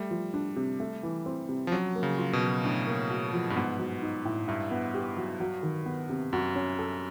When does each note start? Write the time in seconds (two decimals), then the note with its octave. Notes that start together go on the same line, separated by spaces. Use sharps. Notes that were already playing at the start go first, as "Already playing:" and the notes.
Already playing: G3 A3
0.11 F3
0.34 D4
0.56 C3
0.80 A3
1.03 E3
1.26 C4
1.49 C3
1.67 F3
1.72 F#3 C#4
1.96 A#3
2.03 C#3
2.18 F4
2.33 B2
2.41 F#3
2.64 A2 D4
2.87 A#3
3.10 F#4
3.33 F3
3.50 G2
3.56 G#2 B3
3.79 F#3
4.02 D#4
4.25 A2
4.48 G2 E4
4.71 B3
4.94 G4
5.17 F#3
5.40 F#3
5.63 D#3
5.86 B3
6.09 C3
6.33 F#2 F#4
6.56 C#4
6.79 A4